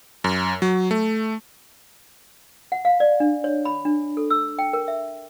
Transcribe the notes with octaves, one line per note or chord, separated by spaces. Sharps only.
F#2
F#3
A3
F#5
F5
D5
D4
C#5
B5
D4
A4
E6
G5
A#4
E5